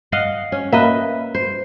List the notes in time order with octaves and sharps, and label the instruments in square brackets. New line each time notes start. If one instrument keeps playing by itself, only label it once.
[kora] D#5 F5 F#5
C#4
[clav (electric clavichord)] A#3 [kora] B4 D#5 E5
[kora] C5